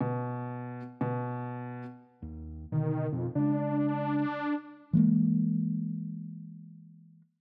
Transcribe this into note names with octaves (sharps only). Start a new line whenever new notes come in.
B2
B2
D#2
B2 D3 D#3
F2 B2
C#3 G#3 D4
E3 G#3 A#3